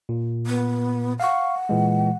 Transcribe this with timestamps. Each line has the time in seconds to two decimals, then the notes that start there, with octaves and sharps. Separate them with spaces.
0.09 A#2
0.47 B3
1.20 F5 F#5 C#6
1.69 A#2 E3 G#3